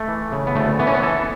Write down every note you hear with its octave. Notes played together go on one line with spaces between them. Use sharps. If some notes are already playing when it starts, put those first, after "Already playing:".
Already playing: A3
E3
C#3
B3
D2 A3
E3 B3
C#4
B3
E3 A4